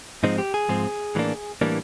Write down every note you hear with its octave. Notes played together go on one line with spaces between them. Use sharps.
G#2 F3 G#3 C4 D#4
G4
G#4
G#2 F3 G#3 C4
A2 E3 G3 A#3 D4
A2 E3 G3 A#3 D4